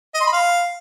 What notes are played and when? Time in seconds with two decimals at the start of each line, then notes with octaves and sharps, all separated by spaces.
0.15 D#5
0.21 C6
0.27 B5
0.33 F5